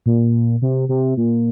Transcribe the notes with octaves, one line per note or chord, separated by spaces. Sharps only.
A#2
C3
C3
A#2